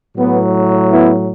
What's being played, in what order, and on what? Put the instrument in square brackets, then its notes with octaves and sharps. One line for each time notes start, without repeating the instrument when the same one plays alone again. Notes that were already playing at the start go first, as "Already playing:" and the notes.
[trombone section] A2 F#3 B3
B3 E4